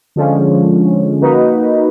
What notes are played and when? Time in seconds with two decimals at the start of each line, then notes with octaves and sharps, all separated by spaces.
0.16 D3 F3 G#3 C#4
1.21 A#3 D#4 F#4 B4